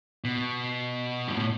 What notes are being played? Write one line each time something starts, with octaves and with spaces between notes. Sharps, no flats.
B2
G2
A2